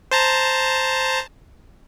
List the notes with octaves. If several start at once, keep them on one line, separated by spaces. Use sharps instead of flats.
C5 A5 A#5